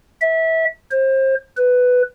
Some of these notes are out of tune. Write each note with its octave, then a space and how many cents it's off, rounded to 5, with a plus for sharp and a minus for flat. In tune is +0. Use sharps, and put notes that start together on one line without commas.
E5 -25
C5 +30
B4 +10